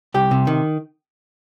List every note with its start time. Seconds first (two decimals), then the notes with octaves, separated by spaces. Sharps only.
0.14 C2 G4
0.31 C3
0.47 D#3